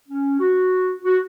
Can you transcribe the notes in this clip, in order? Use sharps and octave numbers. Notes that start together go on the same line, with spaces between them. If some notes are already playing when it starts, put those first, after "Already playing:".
C#4
F#4
F#4